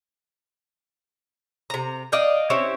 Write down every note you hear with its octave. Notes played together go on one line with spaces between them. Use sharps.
C3 A#5
D5 D#5 F5 G5
C4 C#4 E4 G4